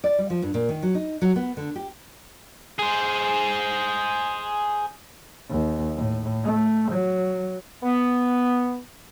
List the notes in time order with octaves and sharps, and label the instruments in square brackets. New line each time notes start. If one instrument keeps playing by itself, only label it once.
[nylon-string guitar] D5
G3
F3
G2
A#2
D#3
F#3
D#4
F#3
B3
D3
G4
[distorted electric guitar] G#4 C5
[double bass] D#2
A2
A3
F#3
[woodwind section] B3